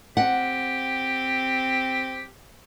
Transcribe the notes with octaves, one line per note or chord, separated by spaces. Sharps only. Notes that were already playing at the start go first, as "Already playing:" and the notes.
C4 G4 F#5